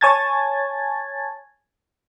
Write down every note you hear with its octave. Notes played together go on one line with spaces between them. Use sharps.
C#5 G#5 A5 G#6 A6